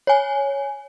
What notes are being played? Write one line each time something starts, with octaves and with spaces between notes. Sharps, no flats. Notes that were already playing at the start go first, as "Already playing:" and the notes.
C#5 G#5